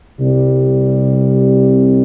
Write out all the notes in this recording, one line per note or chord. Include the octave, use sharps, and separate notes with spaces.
C2 C3 G3